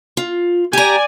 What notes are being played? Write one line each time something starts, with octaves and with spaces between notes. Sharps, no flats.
F4
G4 D5 G#5 A#5